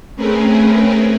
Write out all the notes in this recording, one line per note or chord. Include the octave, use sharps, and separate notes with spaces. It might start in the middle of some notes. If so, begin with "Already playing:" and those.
A3 C4 C#4 G#4 A#4 B4